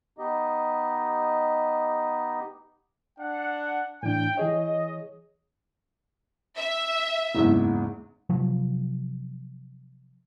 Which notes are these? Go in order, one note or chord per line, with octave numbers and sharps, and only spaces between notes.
B3 D#4 G4 D#5
D4 F#5
A2 E3 D4 G5
E3 G#4 C#5 D#5
E5
F#1 E2 G#2
C3 F3 F#3